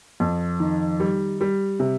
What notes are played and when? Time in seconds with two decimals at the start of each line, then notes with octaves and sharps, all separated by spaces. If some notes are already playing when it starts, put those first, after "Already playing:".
0.20 F2
0.60 D#3
1.00 G3
1.41 G3
1.80 C3